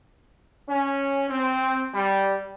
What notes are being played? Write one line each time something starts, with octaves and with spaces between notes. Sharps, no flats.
C#4
C4
G3